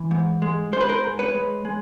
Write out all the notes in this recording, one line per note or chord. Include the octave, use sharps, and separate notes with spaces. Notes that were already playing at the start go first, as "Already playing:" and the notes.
Already playing: E3
G#2
G#3
G#3 C5
B4
A#4 C5
G#2
B4 C#5
G#3
G#3